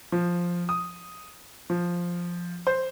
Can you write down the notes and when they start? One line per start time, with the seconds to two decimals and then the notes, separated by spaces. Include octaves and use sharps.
0.12 F3
0.69 D#6
1.70 F3
2.67 C5